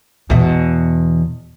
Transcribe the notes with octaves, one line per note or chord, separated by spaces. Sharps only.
E2 B2